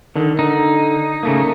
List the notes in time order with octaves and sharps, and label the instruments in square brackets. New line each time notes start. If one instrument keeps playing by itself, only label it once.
[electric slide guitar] D3 D#3
[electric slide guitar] D3 [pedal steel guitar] D#4
[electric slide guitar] C#3 A3 A#3